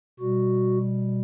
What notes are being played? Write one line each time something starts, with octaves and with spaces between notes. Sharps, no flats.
B2 G3 F#4